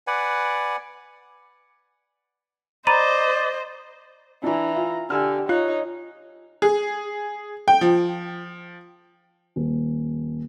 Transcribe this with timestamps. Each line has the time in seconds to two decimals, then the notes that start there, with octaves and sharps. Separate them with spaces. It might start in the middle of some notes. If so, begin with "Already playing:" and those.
0.07 B4 D5 F#5 G#5
2.87 C5 D5 D#5 A#5 B5 D#7
4.43 E3 D4 E4 A#5
4.76 F4
5.10 D3 G4 G#5 E6 F6
5.49 D#4 F4 C#5 F#6
6.62 G#4
7.68 G5
7.81 F3
9.56 D#1